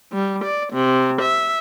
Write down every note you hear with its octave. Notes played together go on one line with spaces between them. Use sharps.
G3
D5
C3
E5